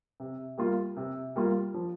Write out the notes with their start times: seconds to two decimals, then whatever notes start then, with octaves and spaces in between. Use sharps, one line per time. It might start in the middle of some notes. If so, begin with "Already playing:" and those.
0.20 C3
0.58 G3 A#3 F4
0.97 C3
1.36 G3 A#3 F4
1.74 F3